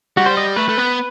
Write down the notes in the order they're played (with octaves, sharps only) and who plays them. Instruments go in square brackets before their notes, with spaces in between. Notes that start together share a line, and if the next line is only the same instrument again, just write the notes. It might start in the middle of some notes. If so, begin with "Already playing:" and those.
[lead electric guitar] G3 [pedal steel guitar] F#4
[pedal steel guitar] C5
D#5
[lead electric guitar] A3 [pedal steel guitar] B4
[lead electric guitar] A3
B3